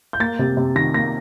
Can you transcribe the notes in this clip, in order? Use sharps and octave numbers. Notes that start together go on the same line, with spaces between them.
G6
A#3 A6
C3
C3
D#3 A#6
A#3 A#6